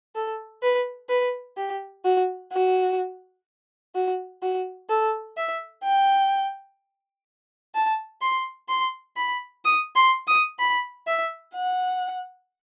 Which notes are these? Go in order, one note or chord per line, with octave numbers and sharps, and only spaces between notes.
A4
B4
B4
G4
F#4
F#4
F#4
F#4
A4
E5
G5
A5
C6
C6
B5
D#6
C6
D#6
B5
E5
F#5